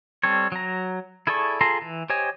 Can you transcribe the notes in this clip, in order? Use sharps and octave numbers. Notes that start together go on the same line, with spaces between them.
G3 C4 A4 C#5
F#3 A#5
E4 G#4 A4 D5 C#6
F4 G#4 A4 A#5 C6
E3
G4 C5 C#5 D#5 G#5